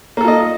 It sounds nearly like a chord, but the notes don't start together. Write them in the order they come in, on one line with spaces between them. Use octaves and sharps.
A#3 A4 F4 D#5